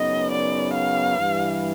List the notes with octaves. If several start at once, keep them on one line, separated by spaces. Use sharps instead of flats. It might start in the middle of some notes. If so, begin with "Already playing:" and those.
Already playing: F#2 C#3 F#3 B3 D#4 D#5
D5
F5
G2 E3 G3